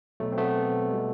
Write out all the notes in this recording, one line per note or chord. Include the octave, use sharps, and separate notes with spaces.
B2 F#3 A3
C4
A3 B3
B2 G3